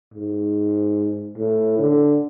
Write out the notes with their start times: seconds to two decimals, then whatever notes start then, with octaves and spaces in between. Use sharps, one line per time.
0.14 G#2
1.37 A2
1.79 D3